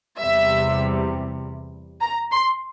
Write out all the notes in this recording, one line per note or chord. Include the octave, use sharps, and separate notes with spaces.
E2 C3 G3 E5
A#5
C6